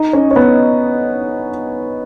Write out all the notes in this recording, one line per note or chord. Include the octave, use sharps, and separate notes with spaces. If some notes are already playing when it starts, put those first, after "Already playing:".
Already playing: D#4 D#5
C#4 C#5
C#5
B3 B4